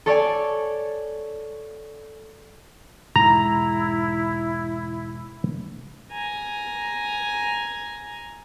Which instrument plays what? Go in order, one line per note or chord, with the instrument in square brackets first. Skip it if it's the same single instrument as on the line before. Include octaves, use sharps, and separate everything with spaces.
[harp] A4 C#5 D5 G#5
[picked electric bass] E1 G#2 [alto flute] E4 [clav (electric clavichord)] A#5
[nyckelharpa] G#5 A#5